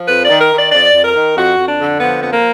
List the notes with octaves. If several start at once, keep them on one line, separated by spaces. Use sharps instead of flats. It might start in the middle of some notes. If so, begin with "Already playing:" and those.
Already playing: F3
F2 B4
D5
D#3
A#4
D#3
D5
F2 D5
F2
A#4
D#3
F2 F#4
F2
D4
D3
F3 B3
F2 B3
A#3